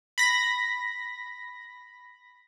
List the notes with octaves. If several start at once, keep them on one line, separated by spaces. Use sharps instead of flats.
B5 A#6